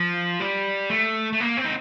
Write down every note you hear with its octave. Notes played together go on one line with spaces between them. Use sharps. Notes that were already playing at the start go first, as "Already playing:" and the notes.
Already playing: F3
G3
A3
A3
A#3
C4
D#4